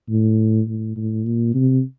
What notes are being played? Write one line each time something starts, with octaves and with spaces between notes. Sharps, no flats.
A2
A2
A2
A#2
C3